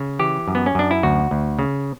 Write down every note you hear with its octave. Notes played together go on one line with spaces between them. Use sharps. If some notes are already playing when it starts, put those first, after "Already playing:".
Already playing: C#3
E3 G4
F#2
B3
C#4
F#2 D4
E4
D2 F#4
D2
C#3